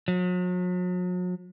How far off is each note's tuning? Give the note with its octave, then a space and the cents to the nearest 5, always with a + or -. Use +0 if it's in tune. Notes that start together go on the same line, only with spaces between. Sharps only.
F#3 -40